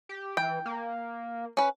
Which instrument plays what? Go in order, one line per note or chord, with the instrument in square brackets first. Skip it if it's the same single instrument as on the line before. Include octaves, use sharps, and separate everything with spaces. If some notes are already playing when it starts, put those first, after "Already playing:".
[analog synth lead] G4
[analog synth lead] E3 [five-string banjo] G5
[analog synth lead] A#3
[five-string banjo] C#4 B4